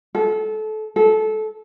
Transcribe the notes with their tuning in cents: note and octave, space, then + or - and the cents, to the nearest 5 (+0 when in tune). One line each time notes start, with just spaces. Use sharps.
A4 -25
A4 -20